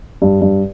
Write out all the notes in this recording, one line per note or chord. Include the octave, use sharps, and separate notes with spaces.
G2
G2